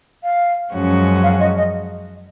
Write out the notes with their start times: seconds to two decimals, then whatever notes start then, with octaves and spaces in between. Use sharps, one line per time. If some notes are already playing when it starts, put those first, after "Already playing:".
0.23 F5
0.73 F#2 F3 G#3 C#4 F#4
1.23 F5
1.40 D#5
1.57 D#5